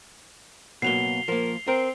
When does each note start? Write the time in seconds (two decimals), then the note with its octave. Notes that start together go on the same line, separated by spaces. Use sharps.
0.82 B2 F#3 A#3 C7 F7 G7
1.28 F3 A#3 A#4
1.68 C4 A#4